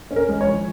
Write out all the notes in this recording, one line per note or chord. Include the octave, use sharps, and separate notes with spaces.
C#4
A#4
G#3
C#5
F3